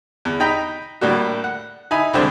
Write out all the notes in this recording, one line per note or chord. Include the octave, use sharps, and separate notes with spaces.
E2
D#4 G5 A#5 B5
A2 G3 A#3 D4 F#4
F#5
D#4 E4 G#5 B5
C2 F2 D3 G#3 C4 D4